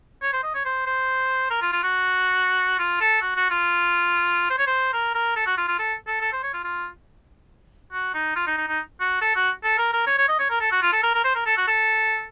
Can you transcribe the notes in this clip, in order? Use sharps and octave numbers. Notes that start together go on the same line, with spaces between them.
C#5
C5
D#5
C#5
C5
C5
A#4
F4
F4
F#4
F4
A4
F#4
F#4
F4
C5
C#5
C5
A#4
A#4
A4
F#4
F4
F4
A4
A4
A4
C5
C#5
F4
F4
F#4
D#4
F4
D#4
D#4
D#4
F#4
A4
F#4
A4
A#4
A#4
C#5
C#5
D#5
C#5
A#4
A4
F#4
F4
A4
A#4
A#4
C5
A#4
A4
F#4
A4